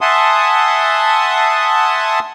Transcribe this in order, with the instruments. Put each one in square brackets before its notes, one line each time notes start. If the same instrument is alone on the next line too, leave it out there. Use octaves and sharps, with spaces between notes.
[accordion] E5 F#5 G#5 A5 C6 D#6